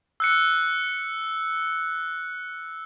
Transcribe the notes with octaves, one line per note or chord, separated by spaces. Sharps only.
E6 F#6 C#7